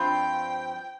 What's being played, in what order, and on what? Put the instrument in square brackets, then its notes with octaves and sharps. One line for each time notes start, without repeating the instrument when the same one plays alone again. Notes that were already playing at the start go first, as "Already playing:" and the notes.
Already playing: [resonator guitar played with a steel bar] G2 F3 C4 F4 [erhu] G5